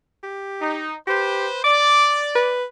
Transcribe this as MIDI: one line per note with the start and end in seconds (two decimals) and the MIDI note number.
0.23 0.84 67
0.60 0.96 63
1.07 1.47 67
1.07 1.59 71
1.07 1.59 72
1.64 2.56 74
1.64 2.12 86
2.35 2.64 71